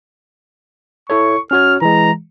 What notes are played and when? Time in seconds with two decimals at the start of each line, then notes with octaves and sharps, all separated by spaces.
1.10 E4 A4 C#5 C#6
1.51 C#4 F#4 C#5 F6
1.82 E3 G#3 A#5